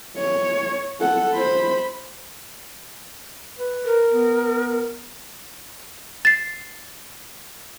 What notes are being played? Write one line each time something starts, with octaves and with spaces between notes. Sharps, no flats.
C#5
A4 F#5
C5 B5
B4
A#4
B3
A6 C7